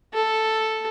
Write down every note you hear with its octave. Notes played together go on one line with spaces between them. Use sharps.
A4